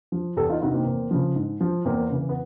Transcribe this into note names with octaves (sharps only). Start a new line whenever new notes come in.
F3
E2 G4 A4
D#4 F4
C3 D#3 E4 F#4
A#3 C4
E2
C#3 F3
G#2
F3
E2 A#3 C4
C#3 E3
B3